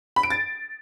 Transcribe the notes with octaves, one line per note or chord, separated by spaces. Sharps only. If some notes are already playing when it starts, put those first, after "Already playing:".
B5
D7
A6